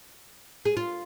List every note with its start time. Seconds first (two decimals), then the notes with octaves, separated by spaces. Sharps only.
0.65 G#4
0.77 F4